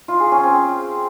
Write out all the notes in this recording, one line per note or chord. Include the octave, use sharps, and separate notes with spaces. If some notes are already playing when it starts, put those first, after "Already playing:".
F4
G#4
C#4
C4